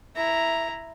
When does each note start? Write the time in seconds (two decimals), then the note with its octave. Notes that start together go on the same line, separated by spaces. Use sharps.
0.16 E4 A#5